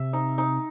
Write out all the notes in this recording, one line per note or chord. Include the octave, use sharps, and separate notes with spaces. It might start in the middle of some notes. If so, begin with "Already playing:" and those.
Already playing: C3 E5
D#4
D#4